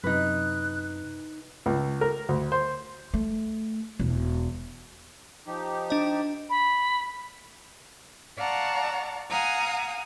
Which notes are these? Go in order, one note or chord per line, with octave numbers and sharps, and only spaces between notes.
F#2 C3 D#4 B4 F#6
C#2
A#4
D2
C5
A3
E1
F3 D#4 G4
D4 D#5
B5
D5 F5 F#5 A5 A#5 C#6
F5 F#5 G#5 A#5 D#6